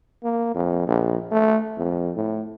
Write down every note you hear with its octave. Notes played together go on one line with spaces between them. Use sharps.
A#3
F2
A#1
A3
F2
A2